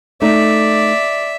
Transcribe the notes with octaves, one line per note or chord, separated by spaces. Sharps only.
A3 D#4 D5 E5